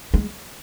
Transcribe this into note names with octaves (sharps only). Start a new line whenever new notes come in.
G#3